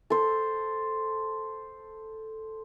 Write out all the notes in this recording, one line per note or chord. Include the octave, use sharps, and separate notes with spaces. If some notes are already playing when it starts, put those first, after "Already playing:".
A4 C5